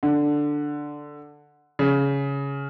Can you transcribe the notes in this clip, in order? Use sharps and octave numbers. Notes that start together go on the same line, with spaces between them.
D3
C#3